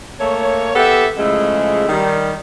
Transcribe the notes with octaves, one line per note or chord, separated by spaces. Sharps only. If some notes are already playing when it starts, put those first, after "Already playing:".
A3 A#3 C#5
B3 G4 A4 B4 E5
C#3 F3 G#3 A3 E4
D#3 G3